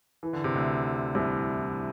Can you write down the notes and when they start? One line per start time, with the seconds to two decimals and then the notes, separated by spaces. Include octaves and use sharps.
0.23 E3
0.33 D3
0.44 C3
0.55 D2 D3
1.15 C2 C3